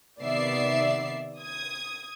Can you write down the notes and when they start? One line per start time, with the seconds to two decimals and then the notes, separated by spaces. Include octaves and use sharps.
0.21 C3 D#3 B3 D5 E5 C7
1.41 D#6 G#6